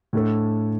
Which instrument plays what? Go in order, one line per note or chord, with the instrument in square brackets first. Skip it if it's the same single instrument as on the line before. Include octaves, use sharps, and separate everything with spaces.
[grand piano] A2 A3 D4 A4